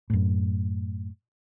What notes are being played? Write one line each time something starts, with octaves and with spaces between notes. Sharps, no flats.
F#2 A2